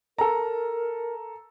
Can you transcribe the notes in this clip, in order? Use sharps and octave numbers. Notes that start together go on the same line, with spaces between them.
A4 A#4 A#5